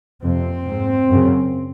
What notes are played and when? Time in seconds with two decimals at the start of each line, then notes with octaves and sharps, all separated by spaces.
0.22 F2 C3 C4
0.67 G#2
1.10 F#2 C#3